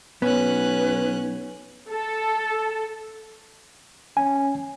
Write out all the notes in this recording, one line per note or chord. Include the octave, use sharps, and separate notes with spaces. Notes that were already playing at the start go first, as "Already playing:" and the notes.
B1 B3 C#4 B4 F#6
A4
C#4 G#5